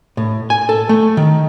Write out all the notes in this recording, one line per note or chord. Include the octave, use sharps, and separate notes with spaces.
A2
G#5
A4
A3
D#3